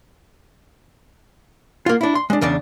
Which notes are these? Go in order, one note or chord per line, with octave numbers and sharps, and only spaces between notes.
A#3 F4
D4 E4
C6
G#3 D4
E2 C#3 D4 D5